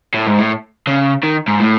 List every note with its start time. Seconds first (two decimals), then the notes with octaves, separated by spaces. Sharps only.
0.14 A2
0.27 G#2
0.39 A2
0.87 C#3
1.24 D#3
1.48 G#2
1.60 A2